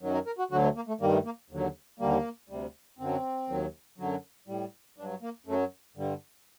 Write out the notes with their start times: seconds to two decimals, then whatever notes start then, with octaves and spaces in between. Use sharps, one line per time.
0.01 F#2 D#3 F#3
0.14 A#4
0.26 A#4
0.39 F#4
0.51 D2 D3 F#3 F#4
0.63 A3
0.76 A#3
0.88 A3
1.01 G2 D#3 G3 A#3
1.13 A3
1.25 A#3
1.50 D#2 D3 F#3
1.99 D#2 D3 G3 A#3
2.49 D2 C3 G3
2.99 F#2 D3 F#3 C4
3.49 D#2 D#3 F#3
3.98 F#2 D3 F#3
4.48 A2 G3
4.97 G2 D4
5.01 F#3
5.22 A#3
5.46 F#2 F#3 A3
5.96 G2 D3 G3